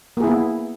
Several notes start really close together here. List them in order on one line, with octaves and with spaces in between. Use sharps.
A#3 G#4 E4 B3